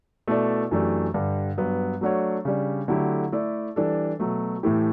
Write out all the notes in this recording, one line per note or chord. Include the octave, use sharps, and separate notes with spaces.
B2 A3 E4 A4 D5
F#2 E3 A3 D4 G4
G2 D3 G3
G2 F#3 B3
F#3 A3 D4 F#4 C#5
C#3 G3 D4
D3 F#3 A3 E4 G4
A3 E4 A4 D5
E3 G3 D4 A4
B2 F#3 A3
A2 E3 A3 E4 G4